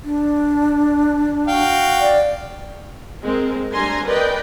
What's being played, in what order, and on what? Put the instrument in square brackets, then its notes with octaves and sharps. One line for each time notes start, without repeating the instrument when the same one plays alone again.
[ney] D4
[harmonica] F#4 F5 G5
[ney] D5
[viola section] G#3 C4 A#4
G3 A3 D4 G#5 A#5 C6
A#4 B4 D5 D#5 G5